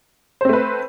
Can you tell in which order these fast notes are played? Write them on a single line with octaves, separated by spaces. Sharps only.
C5 C4 A3 B4